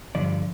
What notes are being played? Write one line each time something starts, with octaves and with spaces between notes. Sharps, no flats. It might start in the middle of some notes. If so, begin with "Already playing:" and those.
G2 D3 F3 D5